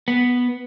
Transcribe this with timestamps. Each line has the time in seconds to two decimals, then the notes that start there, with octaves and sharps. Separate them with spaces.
0.08 B3